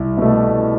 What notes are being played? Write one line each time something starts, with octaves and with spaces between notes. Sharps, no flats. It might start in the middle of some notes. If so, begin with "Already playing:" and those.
Already playing: C2
B2 A3